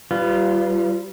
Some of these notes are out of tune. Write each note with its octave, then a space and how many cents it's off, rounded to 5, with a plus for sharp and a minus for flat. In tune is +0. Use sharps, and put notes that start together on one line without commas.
G3 -30 F4 -25 B4 +20